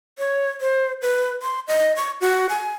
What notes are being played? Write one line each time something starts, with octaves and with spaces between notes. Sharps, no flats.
C#5
C5
B4
C6
D#5
C#6
F#4
G#5